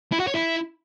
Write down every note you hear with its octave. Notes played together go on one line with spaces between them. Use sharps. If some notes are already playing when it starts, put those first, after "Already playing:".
E4
F#4
C#5
E4